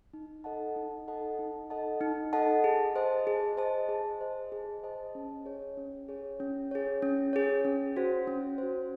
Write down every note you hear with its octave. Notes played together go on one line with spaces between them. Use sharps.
D#4
A4 D#5 F#5 A5
D#4
A4 D#5 F#5 A5
D#4
A4 D#5 F#5 A5
D#4
A4 D#5 F#5 A5
G#4
C5 D#5 A5
G#4
C5 D#5 A5
G#4
C5 D#5 A5
G#4
C5 D#5 A5
C#4
G#4 C#5
C#4
G#4 C#5
C#4
G#4 C#5
C#4
G#4 C#5
C#4
F#4 C5
C#4
F#4 C5